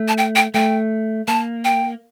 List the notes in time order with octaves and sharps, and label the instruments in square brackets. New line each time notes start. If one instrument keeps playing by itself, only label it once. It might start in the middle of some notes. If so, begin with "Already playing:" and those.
Already playing: [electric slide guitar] A3
[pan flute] A5
G5
G5
[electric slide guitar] A3 [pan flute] G5
[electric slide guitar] A#3 [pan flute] A5
[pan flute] G5